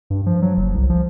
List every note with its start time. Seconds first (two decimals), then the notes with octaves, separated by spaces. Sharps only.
0.10 G2
0.26 F3
0.42 F#3
0.57 F#1
0.75 C2
0.89 F3